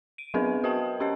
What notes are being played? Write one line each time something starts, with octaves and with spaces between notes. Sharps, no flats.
D7 D#7
F#3 B3 D4 G#4 A#4 B4
F#4 A#4 B4 D#5 G5 A5
C#4 G4 C5 D#5